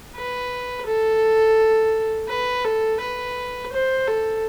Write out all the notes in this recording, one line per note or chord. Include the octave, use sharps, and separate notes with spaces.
B4
A4
B4
A4
B4
C5
A4